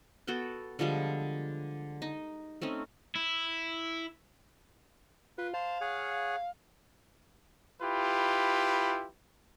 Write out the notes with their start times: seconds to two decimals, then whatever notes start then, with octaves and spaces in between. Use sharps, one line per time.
0.27 B3 F#4 A4 G5
0.79 D3 F3 G3 G#3
2.02 D#4
2.62 A3 C4 C#4 D#4
3.16 E4
5.38 F4 B4
5.54 C5 F5 A5
5.81 G#4 C#5 F#5
7.82 E4 F4 G4 B4